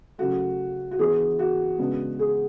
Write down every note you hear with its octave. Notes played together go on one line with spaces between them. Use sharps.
C#3 F#3 A3 F#4
F#4
E3 B3 D4 G#4
F#4
C#3 G#3 B3 D4
G#4